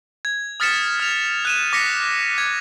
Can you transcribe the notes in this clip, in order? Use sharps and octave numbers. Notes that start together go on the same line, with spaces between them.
G#6
D#6 F6 A6 B6 C#7 E7
F6 F7
F#6 D#7 E7
D6 A#6 B6 C#7
G#6